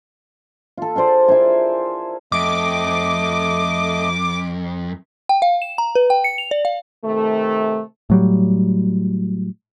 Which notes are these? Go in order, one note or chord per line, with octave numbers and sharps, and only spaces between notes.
F4 A4
F4 G#4 C5 D5
E4 A#4 C5 G#5
F2 A3 D#5 D6
G5
F5
E7
A#5
B4
G5
C#7
F7
D5
F5
C3 D#3 A3
A2 F#3 G3